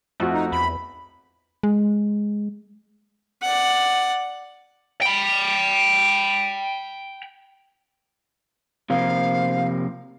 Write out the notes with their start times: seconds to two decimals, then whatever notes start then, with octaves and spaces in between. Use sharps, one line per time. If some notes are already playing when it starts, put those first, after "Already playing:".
0.20 F2 A3 F#4
0.34 D#4
0.52 E2 B5
1.63 G#3
3.42 D5 F#5
5.01 G5 B5
8.90 C3 F3 A#3 F5